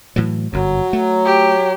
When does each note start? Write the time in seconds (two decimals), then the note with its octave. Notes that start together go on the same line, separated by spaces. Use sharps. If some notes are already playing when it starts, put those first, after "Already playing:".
0.16 A2 E3 F#3
0.53 G1 F#2 F#3
0.93 A3
1.25 G4